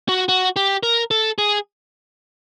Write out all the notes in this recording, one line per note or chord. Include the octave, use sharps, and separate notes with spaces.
F#4
F#4
G4
A#4
A4
G#4